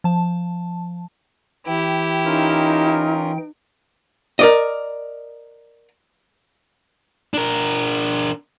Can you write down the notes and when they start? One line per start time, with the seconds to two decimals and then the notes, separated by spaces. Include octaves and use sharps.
0.04 F3 A5
1.67 E3 E4 G4 G5
2.25 C#4 D#4 F4 A#4
4.39 A#4 D5 D#5
7.34 D4 A#4